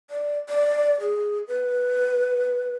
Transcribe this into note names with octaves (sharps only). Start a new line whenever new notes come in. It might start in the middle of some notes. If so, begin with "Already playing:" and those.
D5
D5
G#4
B4